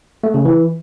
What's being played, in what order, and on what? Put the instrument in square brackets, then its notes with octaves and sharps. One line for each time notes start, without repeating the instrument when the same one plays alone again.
[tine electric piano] A3
C#3
E3